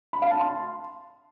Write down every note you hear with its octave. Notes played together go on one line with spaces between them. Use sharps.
B5
F5
A5
C6